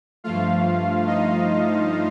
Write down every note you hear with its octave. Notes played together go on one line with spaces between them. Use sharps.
G2 F3 A3 F4 F5
D#4 D#5